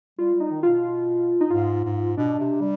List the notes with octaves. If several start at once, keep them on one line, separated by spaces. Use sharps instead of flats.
G3 F4
G3
D#4
D#3
B2 F4
D#4
G#2 F4
G#2
B2 D4
C3
G3